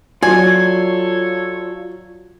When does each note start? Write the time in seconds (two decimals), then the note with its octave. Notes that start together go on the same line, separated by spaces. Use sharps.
0.23 F#3 F4 A4 C#5 D5 G#5